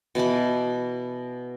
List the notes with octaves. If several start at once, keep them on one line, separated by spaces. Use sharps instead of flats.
B2 E3 A5 B5